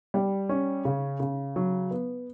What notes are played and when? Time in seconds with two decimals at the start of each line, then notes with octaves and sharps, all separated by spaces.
0.14 G3
0.49 C#4
0.85 C#3
1.20 C#3
1.56 F#3
1.91 B3